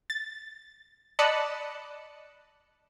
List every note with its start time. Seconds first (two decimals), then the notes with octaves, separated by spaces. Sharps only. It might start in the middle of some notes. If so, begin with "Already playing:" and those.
0.10 A6
1.19 D5 D#5 A5 B5 F#6 C#7